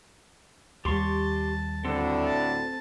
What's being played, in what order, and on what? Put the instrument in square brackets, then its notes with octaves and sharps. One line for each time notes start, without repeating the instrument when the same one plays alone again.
[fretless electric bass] D#2 G3 [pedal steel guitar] G4 C6 C#6 [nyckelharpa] A5
[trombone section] D2 A2 D3 [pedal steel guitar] C4 A4
[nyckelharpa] A5